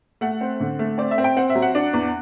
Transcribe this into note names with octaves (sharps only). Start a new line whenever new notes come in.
A3 F#5
C4
D3
A3
C4 D5
E5
C4
G5
C4 F#5
E5
F#3
F#5
D4
E2